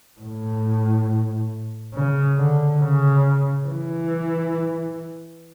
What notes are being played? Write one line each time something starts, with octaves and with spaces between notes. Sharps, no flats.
A2
C#3
D3
C#3
E3